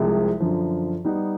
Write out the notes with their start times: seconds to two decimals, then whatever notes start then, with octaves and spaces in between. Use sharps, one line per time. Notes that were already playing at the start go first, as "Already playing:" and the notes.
Already playing: C2 C3 F3 G#3
0.40 F#2 D3 F3
1.05 G3 B3 D#4